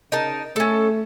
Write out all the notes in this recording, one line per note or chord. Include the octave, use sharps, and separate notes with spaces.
C#3 D#4 A#4 A5
A3 C#4 A4